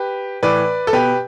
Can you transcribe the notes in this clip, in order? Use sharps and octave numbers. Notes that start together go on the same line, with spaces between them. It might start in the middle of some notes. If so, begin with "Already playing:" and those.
Already playing: G4 B4
A2 E3 B4 D5
A4
B2 G4 B4